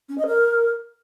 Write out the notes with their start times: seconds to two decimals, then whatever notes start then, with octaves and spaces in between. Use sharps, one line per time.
0.09 C#4
0.18 D#5
0.27 A#4